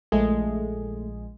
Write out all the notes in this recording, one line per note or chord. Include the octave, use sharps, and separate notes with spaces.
A#1 G#3 A3